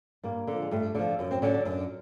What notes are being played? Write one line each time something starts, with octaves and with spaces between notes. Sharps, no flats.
G2 A#3
D3 F3
G#3
G2 A3
D3 F3
F#2
C4
D3 F#3 C#4
D4
F#2 D4